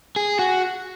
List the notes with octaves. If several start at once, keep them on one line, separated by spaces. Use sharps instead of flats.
G#4
F#4